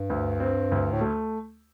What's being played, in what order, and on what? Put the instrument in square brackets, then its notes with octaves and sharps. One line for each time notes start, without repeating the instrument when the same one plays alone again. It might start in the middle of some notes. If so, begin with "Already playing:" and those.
Already playing: [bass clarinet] G2
[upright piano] D2
C4
D2
[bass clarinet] A2
[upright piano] A3